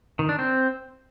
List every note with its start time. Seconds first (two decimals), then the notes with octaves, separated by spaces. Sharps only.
0.19 D#3
0.29 D4
0.39 C4